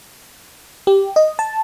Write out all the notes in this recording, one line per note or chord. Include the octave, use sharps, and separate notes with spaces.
G4
D#5
A5